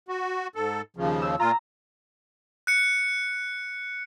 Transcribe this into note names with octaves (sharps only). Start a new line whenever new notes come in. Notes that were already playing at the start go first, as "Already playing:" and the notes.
F#4
G#2 A4
D#2 C#3 F3
E6
A#2 F4 A#5 A#6
F#6 C#7